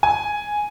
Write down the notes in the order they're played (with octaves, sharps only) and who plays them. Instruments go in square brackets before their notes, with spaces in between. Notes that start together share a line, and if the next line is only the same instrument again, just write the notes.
[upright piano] G#5